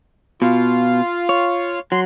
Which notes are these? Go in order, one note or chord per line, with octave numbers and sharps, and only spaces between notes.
B2 F4
C#5
F#3 C6